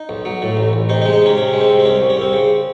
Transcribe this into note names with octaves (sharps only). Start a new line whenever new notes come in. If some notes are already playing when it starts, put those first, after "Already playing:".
Already playing: D#4
B1
F#3
A2
A1
A1
C3 D#4
D#4
G#3
D#4
C3 C#4
C3 C#4
G#3
C4
C3
C4
C2 C#4
C2
C#4
C2 C4
C#3